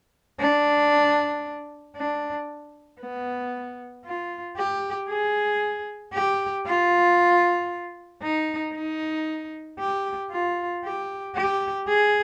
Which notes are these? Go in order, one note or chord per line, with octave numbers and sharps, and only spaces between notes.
D4
D4
B3
F4
G4
G#4
G4
F4
D#4
D#4
G4
F4
G4
G4
G#4